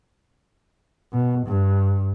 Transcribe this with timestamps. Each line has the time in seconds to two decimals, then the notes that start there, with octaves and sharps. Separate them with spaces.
1.12 B2
1.46 G2